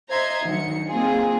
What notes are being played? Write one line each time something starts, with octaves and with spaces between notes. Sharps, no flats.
C5 D#5 E5 A#5 C6 G#6
D2 D#3 F#3 C#7
A#3 C4 D#4 F4 G#4